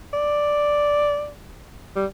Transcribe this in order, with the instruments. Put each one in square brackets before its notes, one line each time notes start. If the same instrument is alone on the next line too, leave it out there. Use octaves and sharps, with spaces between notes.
[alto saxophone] D5
G3